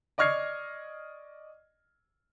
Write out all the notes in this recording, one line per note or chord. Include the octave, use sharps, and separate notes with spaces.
D5 D#5 C#6 F6 G#6 C7